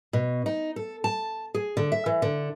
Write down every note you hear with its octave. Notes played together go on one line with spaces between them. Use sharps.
B2
D#4
A4
A5
G#4
D3
E5
E3
D3